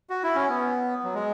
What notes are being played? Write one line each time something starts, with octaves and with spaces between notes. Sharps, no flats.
F#4
E4
C#4
B3
F#3
G#3